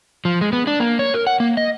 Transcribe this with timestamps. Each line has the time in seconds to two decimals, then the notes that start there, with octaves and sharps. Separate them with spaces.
0.25 F3
0.41 G#3
0.53 B3
0.67 D4
0.80 A#3
0.99 C#5
1.14 A#4
1.27 F#5
1.40 A#3
1.57 D#5